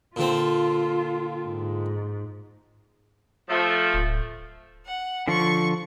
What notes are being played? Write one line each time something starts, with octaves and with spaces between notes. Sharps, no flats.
A#2 D3 C4 F4
G#2
F3 A3
D1
F#5
D3 F3 F4 C#6